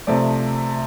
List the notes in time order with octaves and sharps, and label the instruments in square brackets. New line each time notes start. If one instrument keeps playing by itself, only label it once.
[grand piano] C3 F3 A3 D5